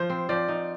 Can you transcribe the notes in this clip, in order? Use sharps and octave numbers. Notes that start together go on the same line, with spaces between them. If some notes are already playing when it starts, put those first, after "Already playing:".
Already playing: F3 C5
C4
F3 D5
D#4